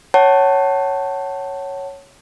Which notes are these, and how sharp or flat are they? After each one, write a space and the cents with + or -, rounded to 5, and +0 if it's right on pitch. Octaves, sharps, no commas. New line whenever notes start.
C#5 +0 F#5 +30 A5 +5